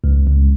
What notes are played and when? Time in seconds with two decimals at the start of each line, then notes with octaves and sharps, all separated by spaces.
0.04 C#2
0.26 C#2